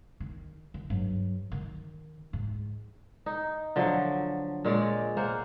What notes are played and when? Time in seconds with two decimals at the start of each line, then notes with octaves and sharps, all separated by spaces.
0.20 D#3
0.74 D#3
0.90 G2 F#3
1.52 D#3
2.33 G#2
3.26 D#4
3.76 D3 F3 F#3
4.65 A#2 G#3 C#5 D5
5.17 A#3 C5 F#5